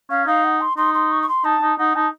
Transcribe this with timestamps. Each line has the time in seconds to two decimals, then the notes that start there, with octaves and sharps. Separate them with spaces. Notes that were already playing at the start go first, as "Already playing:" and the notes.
0.10 C#4 F5
0.27 D#4 F5
0.44 F#5
0.61 C6
0.77 D#4 C6
0.94 C6
1.11 C#6
1.22 C#6
1.28 C6
1.44 D#4 A5
1.62 D#4
1.79 D#4 F#5
1.96 D#4 A5